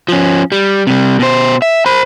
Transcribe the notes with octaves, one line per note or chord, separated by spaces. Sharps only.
F3 C#4
G3
C3 G3
B2 C5
E5
C5 B5